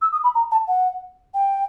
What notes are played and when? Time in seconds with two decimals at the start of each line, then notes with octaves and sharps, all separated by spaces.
0.02 E6
0.12 D#6
0.24 B5
0.35 A#5
0.51 A5
0.68 F#5
1.34 G5